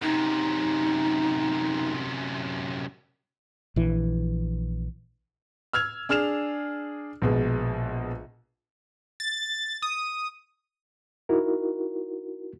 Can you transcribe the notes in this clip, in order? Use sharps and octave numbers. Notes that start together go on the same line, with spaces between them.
F#2 C3 D#4
A#1 E3
E6 F6 G#6 F7
D4 G#4 F6 E7 F7
A#1 B2 G#3
A6
D#6
D#4 E4 F#4 A#4